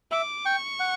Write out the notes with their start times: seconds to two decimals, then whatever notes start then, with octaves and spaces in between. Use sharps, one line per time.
0.11 E5 D6
0.46 G5 C#6
0.80 F#5